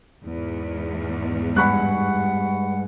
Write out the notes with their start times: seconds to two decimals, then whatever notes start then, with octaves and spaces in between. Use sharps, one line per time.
0.25 E2 G#2
1.56 G2 G#3 F#5 B5 C#6 F#6